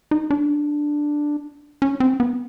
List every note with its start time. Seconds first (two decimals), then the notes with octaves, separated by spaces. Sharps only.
0.11 D#4
0.31 D4
1.82 C#4
2.00 C4
2.20 B3